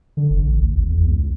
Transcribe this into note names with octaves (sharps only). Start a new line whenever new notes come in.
D3
F#1
A1
D2
G#1
E2
C#2